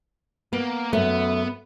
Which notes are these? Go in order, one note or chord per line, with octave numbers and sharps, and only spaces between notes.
A#3 B3
F#2 A3 B3